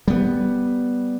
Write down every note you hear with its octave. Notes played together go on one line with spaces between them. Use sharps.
G3 B3